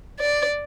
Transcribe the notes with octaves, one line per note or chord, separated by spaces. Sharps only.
D5